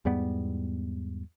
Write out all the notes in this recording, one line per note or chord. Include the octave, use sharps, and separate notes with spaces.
E2 G#2 G3 B3